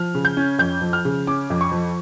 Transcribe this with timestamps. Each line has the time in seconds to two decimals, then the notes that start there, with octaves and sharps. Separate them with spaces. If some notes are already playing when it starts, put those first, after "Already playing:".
Already playing: F3 F6
0.15 C#3
0.25 G6
0.37 C#4
0.59 F2 G6
0.82 F3
0.93 F6
1.05 C#3
1.27 C#4 D6
1.50 F2
1.61 C#6
1.72 F3